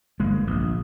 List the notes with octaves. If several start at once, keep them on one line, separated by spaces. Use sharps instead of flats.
G1 G#3 A#3
A#1